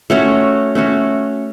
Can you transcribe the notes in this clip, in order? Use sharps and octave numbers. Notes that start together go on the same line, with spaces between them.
A3 C#4 F#4 C#5
A3 C#4 F#4 C#5